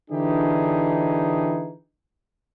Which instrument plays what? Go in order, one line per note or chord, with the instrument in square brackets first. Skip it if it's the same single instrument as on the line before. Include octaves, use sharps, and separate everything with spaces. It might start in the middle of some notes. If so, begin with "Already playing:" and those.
[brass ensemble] D3 E3 D4 D#4 G4 G#4